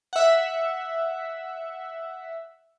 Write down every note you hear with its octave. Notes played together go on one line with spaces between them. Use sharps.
E5 F#5